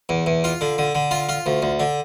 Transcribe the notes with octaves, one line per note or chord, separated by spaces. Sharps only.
E2
E2
F4
D3
D3
D3
F4
F4
D2
D2
D3